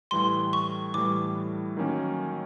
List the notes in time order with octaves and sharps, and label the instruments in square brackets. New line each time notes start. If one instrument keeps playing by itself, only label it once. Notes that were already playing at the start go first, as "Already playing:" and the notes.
[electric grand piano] A2 E3 G3 [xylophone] C6
[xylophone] C#6
[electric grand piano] A2 E3 G3 [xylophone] D6
[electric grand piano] D#3 F#3 A#3 C#4